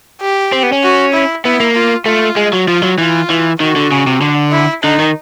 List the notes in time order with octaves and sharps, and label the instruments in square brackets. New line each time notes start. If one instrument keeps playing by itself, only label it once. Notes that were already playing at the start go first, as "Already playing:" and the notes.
[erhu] G4
[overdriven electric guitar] C4
B3
C#4
[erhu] F#4
E4
[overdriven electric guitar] B3 [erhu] E4
[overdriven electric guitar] A#3
[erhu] F4
[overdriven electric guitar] A3 [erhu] F4
[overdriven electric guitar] G#3
F#3
[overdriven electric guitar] F3 [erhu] F4
[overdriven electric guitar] F#3
[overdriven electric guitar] E3 [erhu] F4
[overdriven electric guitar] E3
[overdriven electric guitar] D#3 [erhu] F#4
[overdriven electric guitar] D3
C#3
C3
D3
[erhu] E4
[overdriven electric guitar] D3 [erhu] D#4
[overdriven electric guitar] D#3